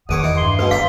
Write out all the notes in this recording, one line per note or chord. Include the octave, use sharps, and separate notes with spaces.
A#1 E2 D#3 B4 C#5 F#5 D6 D#6
E3 D#4
G2 C6
B2 G#3 B4
D#3 D5 F5 G5 A#5